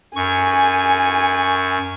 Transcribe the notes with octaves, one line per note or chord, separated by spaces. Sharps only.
F#2 G#5 C#6